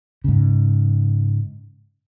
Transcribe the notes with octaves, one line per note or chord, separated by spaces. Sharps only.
G#2 C#3